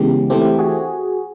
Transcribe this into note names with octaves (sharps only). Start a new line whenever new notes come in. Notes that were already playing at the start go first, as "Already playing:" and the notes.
Already playing: C#3 E3 G#3 B3 G4
E3 A3 C4 G4
G4
F#4 G#4